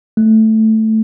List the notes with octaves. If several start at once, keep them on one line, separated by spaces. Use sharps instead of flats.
A3